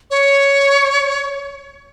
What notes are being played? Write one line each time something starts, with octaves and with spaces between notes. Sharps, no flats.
C#5